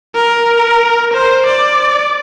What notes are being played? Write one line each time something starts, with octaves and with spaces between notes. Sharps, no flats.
A#4
C5
D5